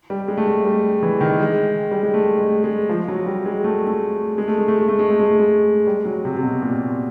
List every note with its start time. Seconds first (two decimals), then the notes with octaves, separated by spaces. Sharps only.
0.10 G3
0.28 G#3
0.37 A3
0.47 G#3
0.65 G3
1.03 E3
1.21 D#3
1.40 G#3
1.91 G3
2.03 G#3
2.14 A3
2.39 G#3
2.64 G#3
2.89 F3
3.08 F#3
3.26 G3
3.46 G#3
3.64 A3
3.87 A3
4.38 G#3
4.48 A3
4.58 G#3
4.68 A3
4.79 G#3
4.89 A3
4.99 G#3
5.10 A3
5.19 G#3
5.30 A3
5.39 G#3
5.87 G3
6.05 F#3
6.25 C3
6.37 C3
6.43 B2
6.62 A#2